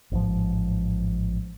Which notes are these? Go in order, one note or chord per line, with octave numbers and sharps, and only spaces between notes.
A1 G#2 B2 F3